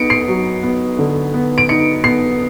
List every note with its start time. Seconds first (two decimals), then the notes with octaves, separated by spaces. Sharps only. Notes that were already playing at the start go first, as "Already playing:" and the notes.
Already playing: B3 D#4 C#7 D7
0.10 C7
0.28 F#3
0.63 B3
0.99 D3
1.34 B3
1.58 D7
1.69 D#4 C#7
2.04 B3 C7